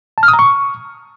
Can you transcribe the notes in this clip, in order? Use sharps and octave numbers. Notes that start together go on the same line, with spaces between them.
A5
F6
D#6
A#5
C#6